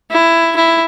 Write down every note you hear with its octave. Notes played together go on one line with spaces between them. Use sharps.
E4
E4